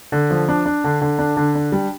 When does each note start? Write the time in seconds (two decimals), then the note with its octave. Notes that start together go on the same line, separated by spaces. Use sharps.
0.12 D3
0.31 F3
0.49 D4
0.66 D4
0.84 D3
1.02 D3
1.19 D4
1.37 D3
1.55 D4
1.72 G3